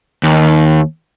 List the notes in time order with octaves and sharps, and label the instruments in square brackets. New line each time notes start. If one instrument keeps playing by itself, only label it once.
[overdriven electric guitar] D#2